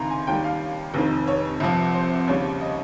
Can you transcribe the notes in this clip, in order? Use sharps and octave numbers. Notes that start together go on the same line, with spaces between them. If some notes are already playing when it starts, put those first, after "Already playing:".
Already playing: C#2 C3 D#3 A#5 C6
G#5
D#2 D#3 G3 G5
F5
F1 F2 D#3
C#5
C2 C3 F3
C5
D#2 C#3 G3 C#5
D#5